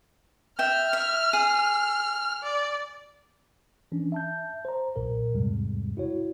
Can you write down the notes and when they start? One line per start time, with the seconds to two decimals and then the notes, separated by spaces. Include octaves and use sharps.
0.59 E5 G5 F6
0.93 E5
1.33 G#4
2.43 D5
3.92 E3 C#4 D4
4.12 E5 A5 G6
4.65 C5 A#5
4.96 B1 A#2 A#4
5.33 E2 G#2 C3 G3 G#3
5.97 E4 F#4 C#5